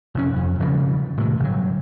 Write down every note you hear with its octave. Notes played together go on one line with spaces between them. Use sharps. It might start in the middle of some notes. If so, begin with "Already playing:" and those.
F1 F#2 C#4
F2
E1 G2 C#3 F3
A2 C3 D#3
G1 F#3